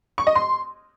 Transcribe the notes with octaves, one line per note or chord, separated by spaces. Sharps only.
C#6
D#5
C6